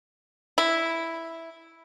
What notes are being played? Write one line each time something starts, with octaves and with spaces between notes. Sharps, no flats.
E4